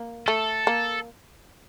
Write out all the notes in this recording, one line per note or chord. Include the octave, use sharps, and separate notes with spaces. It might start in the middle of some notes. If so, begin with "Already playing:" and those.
Already playing: A#3
A3 A4
A#3